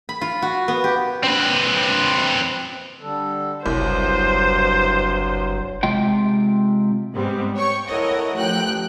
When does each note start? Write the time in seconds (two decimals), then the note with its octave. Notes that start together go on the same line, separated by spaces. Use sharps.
0.09 B5
0.21 F4
0.42 F#4
0.68 B3
0.84 G4
1.24 C4 B4
3.01 D3 G3 A4
3.66 F#1 C2 G2 F#3 C5
5.83 C3 G#3 F4 G5
7.13 G#2 G3 B3 C4
7.55 C#5 G5 C#6
7.87 E4 A4 A#4 C#5 D#5 F#5
8.34 A1 F3 G5 F#6